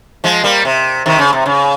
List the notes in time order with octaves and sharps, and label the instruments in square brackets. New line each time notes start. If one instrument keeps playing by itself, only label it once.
[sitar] F3 G#3
G3 A#3
C3
C3 D#3
C#3
C3
C#3